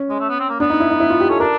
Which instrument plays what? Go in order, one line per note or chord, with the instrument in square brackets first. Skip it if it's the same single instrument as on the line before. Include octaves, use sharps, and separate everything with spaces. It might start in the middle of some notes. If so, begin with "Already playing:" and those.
Already playing: [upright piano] C#4
[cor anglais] G#3
A3
B3
C4
A#3
[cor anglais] B3 [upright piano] D4
[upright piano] D#4
E4
D#4
E4
F4
G4
[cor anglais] C#4 [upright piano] A4
[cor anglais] D4 [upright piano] A#4